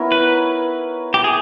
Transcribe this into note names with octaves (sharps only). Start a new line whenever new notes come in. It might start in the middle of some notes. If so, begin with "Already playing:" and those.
Already playing: B3 E4 A#4 C#5
B4
G4
G#4